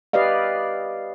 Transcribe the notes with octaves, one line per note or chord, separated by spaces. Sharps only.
G4 B4 D5 D#5 F5